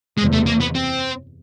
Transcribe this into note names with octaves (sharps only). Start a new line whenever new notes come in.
F#1 E2 C3 G#3
A3
A#3
B3
C4